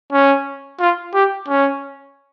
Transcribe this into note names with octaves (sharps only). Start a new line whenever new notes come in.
C#4
F4
G4
C#4